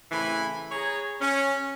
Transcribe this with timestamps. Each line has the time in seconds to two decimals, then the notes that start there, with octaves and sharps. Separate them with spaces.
0.10 A2 C#3 E3 C4 G#5 B5
0.72 G#4 C#5 A#5
1.20 C#4